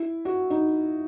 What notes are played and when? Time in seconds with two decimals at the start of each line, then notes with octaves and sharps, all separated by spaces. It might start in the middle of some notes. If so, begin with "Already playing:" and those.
Already playing: E4
0.25 F#4
0.50 D#4